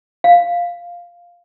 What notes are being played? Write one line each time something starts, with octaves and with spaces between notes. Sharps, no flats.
F5